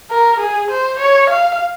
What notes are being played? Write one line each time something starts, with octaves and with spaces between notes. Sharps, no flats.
A#4
G#4
C5
C#5
F5